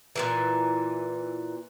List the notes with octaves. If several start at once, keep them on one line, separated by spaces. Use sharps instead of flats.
A#2 C#3 E3